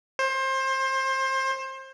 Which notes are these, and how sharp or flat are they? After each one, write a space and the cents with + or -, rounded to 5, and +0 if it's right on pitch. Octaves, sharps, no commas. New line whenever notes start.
C5 +25